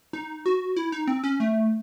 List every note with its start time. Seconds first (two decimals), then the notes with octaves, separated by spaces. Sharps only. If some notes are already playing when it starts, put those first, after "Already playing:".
0.13 D#4
0.46 F#4
0.76 E4
0.92 D#4
1.07 C4
1.24 C#4
1.40 A3